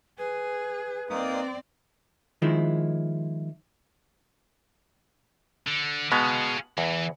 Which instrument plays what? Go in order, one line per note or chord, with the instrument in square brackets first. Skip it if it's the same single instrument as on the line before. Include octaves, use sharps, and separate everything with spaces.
[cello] G#4 [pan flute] B4
[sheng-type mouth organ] A#3 D#4 D#6 [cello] C4 D5
[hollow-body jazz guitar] D#3 F3 G#3 E4
[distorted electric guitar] D3
[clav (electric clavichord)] B2 G#3 B3 [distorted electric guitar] G#4 F5
[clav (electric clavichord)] E2 [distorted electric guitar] E3